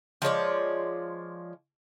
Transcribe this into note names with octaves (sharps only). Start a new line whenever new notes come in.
F3 G#3 C#5 D5